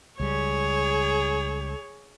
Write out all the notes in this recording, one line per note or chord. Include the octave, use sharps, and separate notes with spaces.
C#2 G3 G#4 C#5